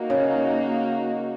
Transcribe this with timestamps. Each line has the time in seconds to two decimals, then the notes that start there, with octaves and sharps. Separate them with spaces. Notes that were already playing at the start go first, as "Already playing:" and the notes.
Already playing: A#3 D#4 F#4
0.10 C#3